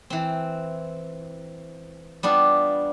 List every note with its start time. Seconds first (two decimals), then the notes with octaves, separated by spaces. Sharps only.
0.10 E3 C4
2.23 G3 B3 D4 F4